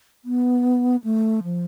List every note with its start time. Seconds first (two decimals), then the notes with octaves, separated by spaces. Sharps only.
0.25 B3
1.04 A3
1.44 F3